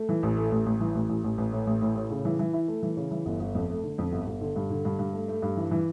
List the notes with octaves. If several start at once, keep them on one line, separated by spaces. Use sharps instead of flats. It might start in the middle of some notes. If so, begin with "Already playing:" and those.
Already playing: A3
E3
A1
A3
A1
A1
E3
A1
A1
A1
A1
A2
A1
A2
A2
C#3
E3
E3
E4
A3
E3
C#3
E3
G1
G1
F2
A3
D3
F2
G1
G1
D3
G2
D3
G2
G2
A3
A3
G2
E3
E3